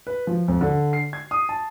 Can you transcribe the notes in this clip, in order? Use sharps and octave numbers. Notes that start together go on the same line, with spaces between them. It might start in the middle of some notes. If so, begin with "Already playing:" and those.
B4
F3
F2
D3
C7
G#6
D#6
A5